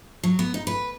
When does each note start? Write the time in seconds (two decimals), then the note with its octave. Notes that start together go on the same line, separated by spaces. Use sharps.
0.23 F#3
0.39 B3
0.54 D#4
0.67 B4